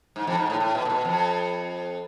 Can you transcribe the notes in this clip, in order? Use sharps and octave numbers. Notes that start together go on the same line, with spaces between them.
G#2
F2
G#2
A2
A2
B2
A2
B2
F2